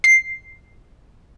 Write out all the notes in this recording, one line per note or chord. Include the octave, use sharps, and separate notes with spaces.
C7